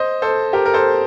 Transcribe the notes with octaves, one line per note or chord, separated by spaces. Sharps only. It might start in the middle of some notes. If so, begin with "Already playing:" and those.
Already playing: C5 D#5
A4 C5
G4 A#4
A#4
A4 C5